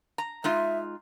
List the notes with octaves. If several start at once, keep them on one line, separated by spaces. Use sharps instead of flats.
A#5
G#3 D#4 F4 E5